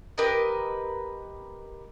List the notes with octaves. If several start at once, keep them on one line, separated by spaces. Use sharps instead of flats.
G4 A#4 B4 D#5